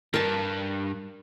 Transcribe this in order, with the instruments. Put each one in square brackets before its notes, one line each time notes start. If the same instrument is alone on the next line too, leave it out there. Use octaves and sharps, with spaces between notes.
[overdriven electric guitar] G2 [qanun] A#4 A5